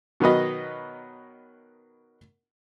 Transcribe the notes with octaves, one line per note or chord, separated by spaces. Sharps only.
B2 D#3 F#3 B4 D#5